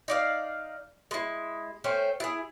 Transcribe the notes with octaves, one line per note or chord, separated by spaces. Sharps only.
D#4 D5 F5
G#3 E4
A3 C#4 C5 G5
E4 G#4